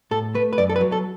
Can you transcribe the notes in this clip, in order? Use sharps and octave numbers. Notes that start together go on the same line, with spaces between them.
A2 A4
A3 B4
B4
F#2 D5
A4
B4
F#3
A4